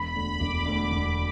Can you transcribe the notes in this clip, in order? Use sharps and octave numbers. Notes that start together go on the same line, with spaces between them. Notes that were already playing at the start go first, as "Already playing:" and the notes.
Already playing: E1 B5
D2 D3
E1 D6
D2 D3
E1